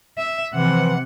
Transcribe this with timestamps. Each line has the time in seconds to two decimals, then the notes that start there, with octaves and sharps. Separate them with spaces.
0.18 E5
0.53 C3 E3 F3 F#5